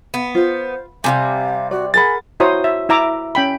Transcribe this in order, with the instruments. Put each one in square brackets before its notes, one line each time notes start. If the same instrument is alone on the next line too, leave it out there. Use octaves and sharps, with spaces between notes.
[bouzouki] B3
[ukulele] F4 [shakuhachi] C5
[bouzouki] C3 F3 G3 [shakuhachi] F5 [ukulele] G#5
[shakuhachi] F#4 [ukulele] D5
[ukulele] G#4 A#4 F#5 [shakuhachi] G#5 [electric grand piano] B5 A6
[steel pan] E4 F#4 C5 C#5 A#5 D#6
E5
E4 E5 A#5 D6
C#4 G5 B5